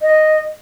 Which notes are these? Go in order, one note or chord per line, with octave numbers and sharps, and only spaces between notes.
D#5